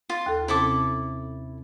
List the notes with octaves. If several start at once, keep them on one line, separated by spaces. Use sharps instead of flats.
F4
D#2 A4
C3 C4 C#4 E4 A4 D6